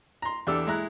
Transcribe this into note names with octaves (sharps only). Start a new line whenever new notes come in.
A#5 C6
E2 D4 G4 A4 E6
G#3 E4 A#5 F#6